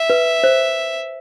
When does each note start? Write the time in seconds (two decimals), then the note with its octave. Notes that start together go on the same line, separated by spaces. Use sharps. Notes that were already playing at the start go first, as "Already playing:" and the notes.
Already playing: E5
0.10 B4
0.44 C5